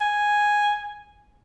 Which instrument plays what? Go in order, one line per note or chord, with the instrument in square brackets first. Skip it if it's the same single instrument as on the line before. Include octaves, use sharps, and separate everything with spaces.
[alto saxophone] G#5